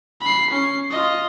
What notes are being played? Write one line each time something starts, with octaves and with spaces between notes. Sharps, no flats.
B5 C7
C#4 C7
F4 D#5